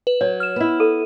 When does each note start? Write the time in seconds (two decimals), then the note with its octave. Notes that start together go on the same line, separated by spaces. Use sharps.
0.07 B4
0.21 F#3 C#5
0.40 F6 E7
0.56 B3 E4
0.80 A4 D#7